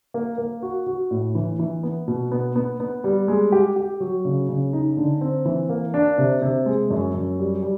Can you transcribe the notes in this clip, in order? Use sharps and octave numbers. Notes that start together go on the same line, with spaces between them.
A#3
A#3
F#4
F#4
A2
E3
E3
B3
B2
B3
B3
B3
G3
G#3
G4
G4
F#3
C#3
C#3
D#4
D3
C4
E3
A#3
D4
C3
C3
G#3
F#2
F#2
G3
G3